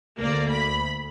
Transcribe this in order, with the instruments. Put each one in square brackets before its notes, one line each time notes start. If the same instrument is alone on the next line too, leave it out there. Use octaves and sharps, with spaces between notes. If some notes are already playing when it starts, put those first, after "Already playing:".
[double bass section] D2 [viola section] A#3 D5
[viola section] B5